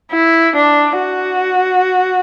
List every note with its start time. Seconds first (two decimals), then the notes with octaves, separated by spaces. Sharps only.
0.12 E4
0.56 D4
1.00 F#4